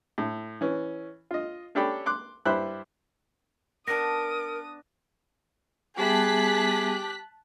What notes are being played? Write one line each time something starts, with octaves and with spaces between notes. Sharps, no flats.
A2
E3 C#4
F4 D#5
C#4 D4 G4 A4 G5 B5
C6 D6 F#6
G2 E4 G4 C5 B5 F#6
B3 D4 A#4 A5 D#6 A#6
G3 B3 G4 G#4 E5 A5 F#6 B6